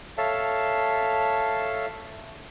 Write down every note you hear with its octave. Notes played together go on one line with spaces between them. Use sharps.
A4 C#5 E5 F5 A5